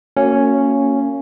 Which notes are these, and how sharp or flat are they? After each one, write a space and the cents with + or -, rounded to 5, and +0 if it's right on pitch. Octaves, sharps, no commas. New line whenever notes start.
A#3 -30 C#4 +0 F#4 -5